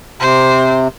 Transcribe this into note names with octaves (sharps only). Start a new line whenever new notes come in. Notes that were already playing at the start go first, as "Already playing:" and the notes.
C3 C5